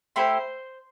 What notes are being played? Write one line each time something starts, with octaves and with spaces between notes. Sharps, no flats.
A3 E4 G4 C5 C6